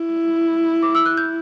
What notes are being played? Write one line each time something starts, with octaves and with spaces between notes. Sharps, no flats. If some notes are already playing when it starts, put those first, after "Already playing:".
Already playing: E4
D6
E6
F#6
G6